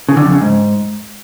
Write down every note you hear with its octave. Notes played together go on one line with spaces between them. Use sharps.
C#3
D3
F2
C#3
G#2